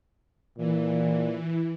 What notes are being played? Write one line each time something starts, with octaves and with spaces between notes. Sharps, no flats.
A#2 E3